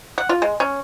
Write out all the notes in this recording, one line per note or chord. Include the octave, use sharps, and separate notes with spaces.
F#5
F4
G#3
C#4